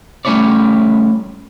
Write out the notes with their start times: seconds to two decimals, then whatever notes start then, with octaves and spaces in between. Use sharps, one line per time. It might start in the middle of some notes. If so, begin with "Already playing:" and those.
0.25 G3 A3 C#4 E4 C#5 D5